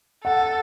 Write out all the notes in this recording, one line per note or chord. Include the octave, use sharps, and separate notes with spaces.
A4 F#5